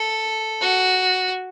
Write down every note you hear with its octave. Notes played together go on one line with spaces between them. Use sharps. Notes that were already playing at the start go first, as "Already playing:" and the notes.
Already playing: A4
F#4